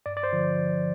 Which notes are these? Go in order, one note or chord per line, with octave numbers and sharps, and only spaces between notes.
G2 D5
D5
C5
D3 F3